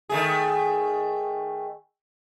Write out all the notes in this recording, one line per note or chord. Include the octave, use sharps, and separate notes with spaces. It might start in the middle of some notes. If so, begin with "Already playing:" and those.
D#3 A3 G#4